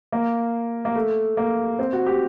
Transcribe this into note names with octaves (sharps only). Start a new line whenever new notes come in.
A#3
A#3
A3
A#3
C4
F#4
G4